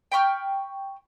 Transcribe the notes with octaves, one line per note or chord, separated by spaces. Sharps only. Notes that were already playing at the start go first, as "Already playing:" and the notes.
G5 B5 C#6 F6